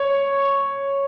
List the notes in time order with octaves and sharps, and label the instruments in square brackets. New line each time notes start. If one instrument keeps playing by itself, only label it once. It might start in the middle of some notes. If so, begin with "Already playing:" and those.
Already playing: [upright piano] C#5